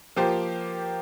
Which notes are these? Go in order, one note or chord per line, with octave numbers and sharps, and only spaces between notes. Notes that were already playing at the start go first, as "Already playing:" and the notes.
F3 A#3 G4 C5